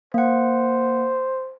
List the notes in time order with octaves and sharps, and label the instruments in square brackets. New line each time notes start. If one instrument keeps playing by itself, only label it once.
[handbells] A#3 F#5 [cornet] C5